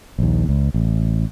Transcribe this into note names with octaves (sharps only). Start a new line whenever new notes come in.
A#1 D#2
C#2
A1